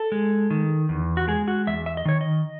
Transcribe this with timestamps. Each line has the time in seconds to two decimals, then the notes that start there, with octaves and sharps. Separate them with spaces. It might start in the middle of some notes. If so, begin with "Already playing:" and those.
Already playing: A4
0.12 G#3
0.50 D#3
0.89 E2
1.17 F#4
1.28 G#3 G#4
1.48 F#4
1.67 E2 E5
1.86 E5
1.97 D#5
2.05 D#3 C#5
2.21 D#5